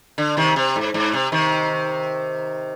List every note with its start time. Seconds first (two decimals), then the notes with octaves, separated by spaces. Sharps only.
0.18 D3
0.37 C3 D#3
0.56 C3
0.76 G#2
0.94 G#2
1.14 C3
1.32 C3 D#3